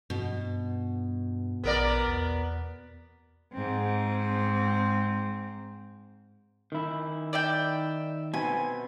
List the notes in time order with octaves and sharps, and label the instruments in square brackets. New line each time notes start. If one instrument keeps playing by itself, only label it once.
[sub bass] G2 [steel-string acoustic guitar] B2
[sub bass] A#1 [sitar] B3 A#4 D5
[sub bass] E2
[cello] G#2 C4
[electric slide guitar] D#3 E4
[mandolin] D5 E5 G5
[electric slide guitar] B2 B3 C4 [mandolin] G#5